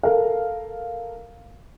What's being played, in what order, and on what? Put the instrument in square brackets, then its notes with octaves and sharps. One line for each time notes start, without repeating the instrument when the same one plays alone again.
[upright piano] A4 A#4 F5